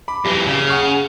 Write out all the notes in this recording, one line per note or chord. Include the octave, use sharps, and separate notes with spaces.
B5 D6
F2 E3 G3
F#1 C#3
F#5 C#6 F6